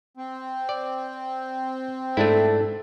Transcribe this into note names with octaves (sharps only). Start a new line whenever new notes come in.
C4
D5
G#2 A3 D4 E4 A4